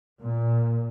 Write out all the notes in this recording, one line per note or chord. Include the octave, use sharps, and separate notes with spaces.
A#2